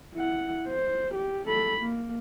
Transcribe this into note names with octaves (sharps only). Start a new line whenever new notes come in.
E4 F#5
C5
G4
A4 B5
A#3